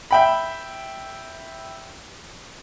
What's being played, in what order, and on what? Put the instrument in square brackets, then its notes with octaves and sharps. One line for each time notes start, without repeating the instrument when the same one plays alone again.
[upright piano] E5 G5 B5